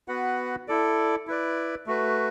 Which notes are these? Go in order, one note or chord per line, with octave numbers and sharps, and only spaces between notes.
B3 F#4 B4 F#5
E4 A4 D5
E4 B4 D5
A3 F#4 B4